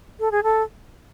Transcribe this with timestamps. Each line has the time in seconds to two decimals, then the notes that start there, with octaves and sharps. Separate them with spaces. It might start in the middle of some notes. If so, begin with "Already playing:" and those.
0.20 A4
0.31 G#4
0.43 A4